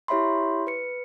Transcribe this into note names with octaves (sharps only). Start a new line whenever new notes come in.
E4 G4 C#5 E5 B5 C6
B4 C#7